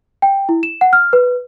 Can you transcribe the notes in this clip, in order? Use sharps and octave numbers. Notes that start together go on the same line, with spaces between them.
G5
E4
E7
F#5
F6
B4